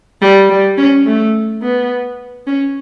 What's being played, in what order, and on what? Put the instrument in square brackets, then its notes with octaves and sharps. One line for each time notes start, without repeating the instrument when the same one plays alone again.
[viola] G3
G3
C#4
A3
B3
C#4